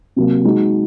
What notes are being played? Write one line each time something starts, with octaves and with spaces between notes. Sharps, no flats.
C3 F#3 A#3
G#3 D#4 F#4